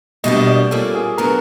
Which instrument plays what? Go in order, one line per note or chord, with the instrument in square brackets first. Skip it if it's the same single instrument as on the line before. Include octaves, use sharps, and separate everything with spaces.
[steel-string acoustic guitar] B2 G3 A#3 D4 G4 [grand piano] D#5
[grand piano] D#5
D5
[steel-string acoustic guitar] A#2 G3 A#3 C#4 [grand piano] A4
[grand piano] G#4
[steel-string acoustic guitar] B2 F#3 B3 D4 [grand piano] A#4